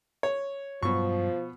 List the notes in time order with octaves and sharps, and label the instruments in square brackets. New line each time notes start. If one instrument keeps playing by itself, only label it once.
[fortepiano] C#5
[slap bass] G2 F#3 [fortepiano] B2 C#6 [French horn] F3